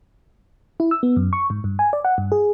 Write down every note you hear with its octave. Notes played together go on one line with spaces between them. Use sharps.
E4
E6
B3
F#2
C#6
G#2
G2
G#5
D5
F#5
G2
G#4